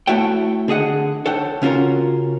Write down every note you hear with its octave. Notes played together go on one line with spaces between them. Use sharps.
A3 E4 F#4 C#5 G5
D3 G#4 D#5 F#5
A4 C#5 F#5 G5
C#3 C#4 F4 F#4 A#4